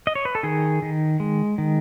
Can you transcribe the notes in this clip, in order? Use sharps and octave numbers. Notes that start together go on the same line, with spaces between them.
D#5
C#5
B4
A4
D#3 G#4
D#3
G#3
D#3